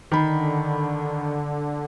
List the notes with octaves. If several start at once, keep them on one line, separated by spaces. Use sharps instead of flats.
D3 D#3 B5